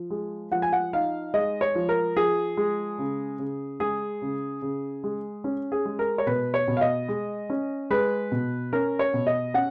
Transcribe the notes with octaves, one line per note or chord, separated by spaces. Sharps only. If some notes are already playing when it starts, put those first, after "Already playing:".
Already playing: F3
G#3
F3 F#5
G#5
F#5
D#4 F5
G#3 D#5
C#5
F3
A#4
F3 G#4
G#3
C#3
C#3
G#3 G#4
C#3
C#3
G#3
C#4
G#4
G#3
A#4
C#5
B2 B4
C#5
B2
F5
D#5
G#3
C#4
G#3 B4
B2
C#4 A#4
C#5
B2
D#5
C#4 F#5